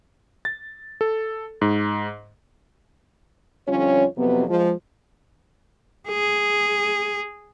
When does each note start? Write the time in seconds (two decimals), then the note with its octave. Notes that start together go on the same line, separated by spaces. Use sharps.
0.45 A6
1.01 A4
1.61 G#2
3.68 F2 D3 G3 C#4 F4 C#5
4.17 F2 C3 F#3 B3
4.48 F3 G#3
6.09 G#4